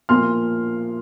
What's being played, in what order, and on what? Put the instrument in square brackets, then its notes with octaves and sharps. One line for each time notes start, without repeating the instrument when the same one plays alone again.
[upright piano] A#2 F3 A#3 C6 F6